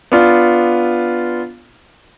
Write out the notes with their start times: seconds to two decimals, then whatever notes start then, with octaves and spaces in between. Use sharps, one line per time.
0.12 B3 D4 F4